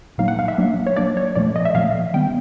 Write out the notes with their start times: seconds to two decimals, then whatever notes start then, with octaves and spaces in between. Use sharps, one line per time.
0.18 A#2 F#3 A#3 D#4 F5
0.28 F#5
0.39 F5
0.48 E5
0.58 F#3 A#3 D4
0.87 C#5
0.97 F#3 A#3 D4 D5
1.17 C#5
1.36 A#2 F3 A3 D5
1.56 D#5
1.65 E5
1.74 A#2 F3 A3 F5
2.14 D#3 G3 B3 G5